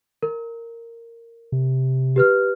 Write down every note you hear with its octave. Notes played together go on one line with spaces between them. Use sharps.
A#4
C3
G4 B4 F6